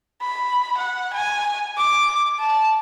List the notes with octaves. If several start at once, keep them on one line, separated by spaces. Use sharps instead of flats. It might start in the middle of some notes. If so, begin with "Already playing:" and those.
B5
F#5
G#5
D6
A5